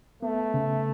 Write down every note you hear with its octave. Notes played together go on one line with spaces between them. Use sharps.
A3 B3
C#3